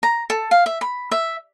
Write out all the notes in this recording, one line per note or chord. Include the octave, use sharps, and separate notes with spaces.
A#5
A4
F5
E5
B5
E5